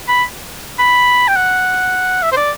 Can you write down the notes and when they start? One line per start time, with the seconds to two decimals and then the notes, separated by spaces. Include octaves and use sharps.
0.08 B5
0.79 B5
1.28 G5
1.36 F#5
2.22 E5
2.32 C5
2.36 D5